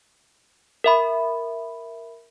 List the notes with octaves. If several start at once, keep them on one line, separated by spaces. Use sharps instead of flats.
A#4 E5 B5